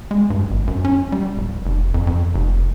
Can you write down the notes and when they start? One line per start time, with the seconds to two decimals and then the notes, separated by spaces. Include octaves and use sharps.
0.11 G#3
0.30 G2
0.51 G#1
0.67 F#2
0.85 C#4
1.12 G3
1.37 D1
1.65 F1
1.94 F2
2.07 F2
2.34 F1